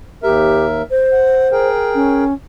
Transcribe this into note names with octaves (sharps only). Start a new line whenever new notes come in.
D#2 G4 A#4 E5
C5
F#5
G#4 A#4 G5
C#4